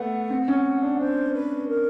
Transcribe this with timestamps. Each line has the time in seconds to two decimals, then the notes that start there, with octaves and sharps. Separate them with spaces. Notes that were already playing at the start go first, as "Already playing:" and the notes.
Already playing: A3 B3 F#5
0.30 C4
0.48 C#4
0.83 D4
0.99 D4 C5
1.33 B4
1.68 A#4